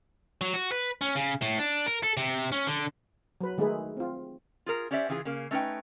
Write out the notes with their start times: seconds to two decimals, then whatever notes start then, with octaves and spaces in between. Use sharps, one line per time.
0.41 F#3
0.54 F#4
0.72 B4
1.01 C#4
1.15 C#3
1.42 A2
1.59 D4
1.87 A#4
2.03 A4
2.17 C3
2.52 C#4
2.67 D3
3.41 F#3 B4
3.58 D#3 G#3 A3 D#4 G#4 B4
3.97 C4 F4
4.66 F4 G#4 A#4
4.91 C#4 G4 C5 D5 E5
5.09 C#3 E3 F4 G4 G#4
5.25 C#3 A#3
5.51 A3 C#4 D#4 A#4 B4 G5